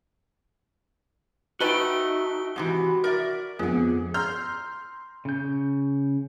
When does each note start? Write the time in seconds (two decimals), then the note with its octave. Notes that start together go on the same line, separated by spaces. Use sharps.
1.60 A3 D#4 F#4 B4 F#5 G5 G7
2.56 G#2 C3 E3 F#4
3.04 A#4 D5 E5
3.59 F2 D3 F3 G#3 B3 G#4
4.14 A#5 C6 E6 F6 G6
5.25 C#3 G6